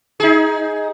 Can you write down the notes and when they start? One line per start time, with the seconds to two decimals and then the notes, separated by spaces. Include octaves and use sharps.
0.20 D#4 G#4